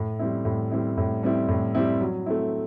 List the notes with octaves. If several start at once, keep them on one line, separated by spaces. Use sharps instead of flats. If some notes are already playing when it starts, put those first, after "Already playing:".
Already playing: A2
G3 C4 E4
A2
G3 C4 E4
A2
G3 C4 E4
A2
G3 C4 E4
F#3
A3 C4 E4